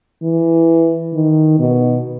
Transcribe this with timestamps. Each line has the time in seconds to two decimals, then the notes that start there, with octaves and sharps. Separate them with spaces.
0.23 E3
1.14 D#3
1.59 B2